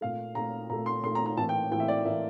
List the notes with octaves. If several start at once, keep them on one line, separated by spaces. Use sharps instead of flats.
A#2 A3 F5
A#2 A3 A#5
A#2 A3 A#5
C6
A#2 A3 C6
A#5
A#5
A2 E3 A#3 A5
G5
A2 E3 A#3 G5
E5
D5
A2 E3 A#3 E5